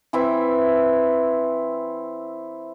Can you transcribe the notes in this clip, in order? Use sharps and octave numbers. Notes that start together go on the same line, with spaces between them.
E3 C4 E4 E5